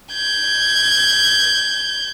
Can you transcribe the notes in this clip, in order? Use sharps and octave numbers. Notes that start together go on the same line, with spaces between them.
G6 G#6